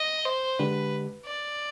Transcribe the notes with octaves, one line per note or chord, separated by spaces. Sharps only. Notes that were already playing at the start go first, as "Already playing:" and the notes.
Already playing: D#5
C5
D3 G#3 D4 G4 B4
D5